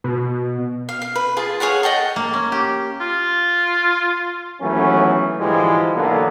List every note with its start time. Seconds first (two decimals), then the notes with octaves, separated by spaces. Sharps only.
0.04 B2
0.89 F5
1.02 F5
1.15 B4
1.37 F4 G#4 A5
1.60 G#4 C#5 F5 F#5
1.83 D#5 F#5 G5 A5
2.16 A#3
2.33 C#4
2.52 G4
3.00 F4
4.61 D#2 E3 F#3 A3 B3 C#4
5.40 G#2 D3 E3 F3 G3 G#3
5.94 B1 D3 E3 A#3 B3 A4